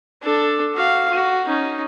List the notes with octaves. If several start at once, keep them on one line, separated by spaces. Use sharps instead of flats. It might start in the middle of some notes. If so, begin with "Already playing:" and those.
D4 A4
F#4 F5
F#4
C#4 D#4